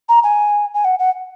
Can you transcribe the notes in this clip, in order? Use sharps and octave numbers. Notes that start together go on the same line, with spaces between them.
A#5
G#5
G#5
F#5
F#5